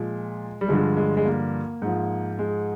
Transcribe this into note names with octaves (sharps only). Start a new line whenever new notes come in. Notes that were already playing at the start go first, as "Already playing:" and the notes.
Already playing: A#2 F3 G#3
G3
G2 D3 F3 G#3
G#3
G#3
A#3
G#2 F3
G#3